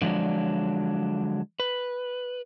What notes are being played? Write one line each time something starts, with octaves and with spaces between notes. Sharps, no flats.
D3 F3 F#3 G#3 D4
B4